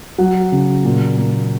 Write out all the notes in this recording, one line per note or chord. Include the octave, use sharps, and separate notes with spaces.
F#3 F#5
C#3
A#2
A#3